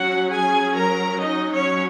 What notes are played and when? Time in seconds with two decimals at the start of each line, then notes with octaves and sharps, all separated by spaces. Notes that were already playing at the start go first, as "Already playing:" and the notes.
Already playing: F#3 C#4 F#4 F#5
0.30 G#4 G#5
0.76 A#4 A#5
1.22 D#4 D#5
1.51 C#4 C#5